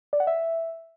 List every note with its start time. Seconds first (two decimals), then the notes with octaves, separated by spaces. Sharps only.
0.13 D5
0.20 F#5
0.27 E5